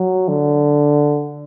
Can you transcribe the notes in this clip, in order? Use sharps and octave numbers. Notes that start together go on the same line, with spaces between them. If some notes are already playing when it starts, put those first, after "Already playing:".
Already playing: F#3
D3